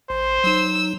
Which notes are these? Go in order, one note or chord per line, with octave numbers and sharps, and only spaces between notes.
A1 C5
F#3 D#4 E6